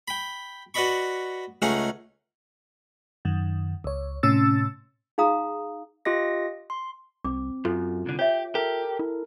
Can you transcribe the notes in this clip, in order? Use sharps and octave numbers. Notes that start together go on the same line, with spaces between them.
G5 B5
F#4 B4 D5 D#5 B5 C#6
C#2 A3 C#4 D#4 G#4 F#5
F#2 D#3
C#2 C#5
A2 C3 C#4 E6 A6
D#4 G#4 F5 A#5 D#6
F4 G4 D#5 A#6
C6
C2 C4 D6
F#2 F4 A4
C2 D3
G4 C#5 E5
G4 A4 A#4
E4